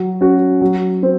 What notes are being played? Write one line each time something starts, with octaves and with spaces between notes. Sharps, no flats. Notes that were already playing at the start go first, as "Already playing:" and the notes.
Already playing: F#3
C#4 F#4
F#3
C4